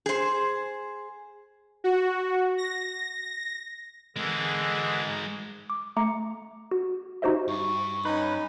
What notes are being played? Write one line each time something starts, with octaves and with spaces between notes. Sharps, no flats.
G#4 C5
F#4
A#6
D3 E3 G#3 G#4 A#4
D6
A3 A#5 D6 C#7
F#4
D#4 F#4 G4 C5 D#5 E5
G2 C#6
C#4 D#4 B4